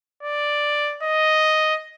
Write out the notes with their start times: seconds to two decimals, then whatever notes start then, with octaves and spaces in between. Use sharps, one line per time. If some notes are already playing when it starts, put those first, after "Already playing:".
0.23 D5
1.03 D#5